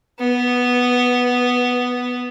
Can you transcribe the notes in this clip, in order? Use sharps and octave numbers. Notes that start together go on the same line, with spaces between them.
B3